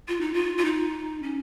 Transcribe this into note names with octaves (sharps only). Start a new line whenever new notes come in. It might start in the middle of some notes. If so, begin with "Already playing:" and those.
F4
D#4
F4
F4
D#4
C#4